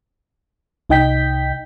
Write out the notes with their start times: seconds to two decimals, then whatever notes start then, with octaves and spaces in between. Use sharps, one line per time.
0.90 C2 D#4 D#5 G5 G6 B6